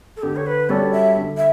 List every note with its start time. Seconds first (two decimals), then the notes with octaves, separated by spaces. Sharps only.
0.17 A4
0.23 D3 G4
0.36 C#5
0.46 B4
0.69 G3 C#4 F#4 A4 D5
0.92 E5
1.16 D3
1.37 E5